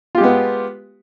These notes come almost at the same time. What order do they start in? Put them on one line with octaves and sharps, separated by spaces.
F4 G4 G#3 B3